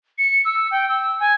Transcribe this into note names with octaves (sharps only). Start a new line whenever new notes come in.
C#7
E6
G5
E6
G#5